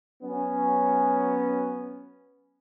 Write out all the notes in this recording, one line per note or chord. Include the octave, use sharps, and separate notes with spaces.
F#3 B3 C#4